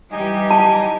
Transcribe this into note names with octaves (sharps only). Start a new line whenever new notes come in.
E3 G3 D#4 G4 D#5 G#5
A5